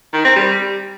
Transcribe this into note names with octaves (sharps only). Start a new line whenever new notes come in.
D#3
C4
G3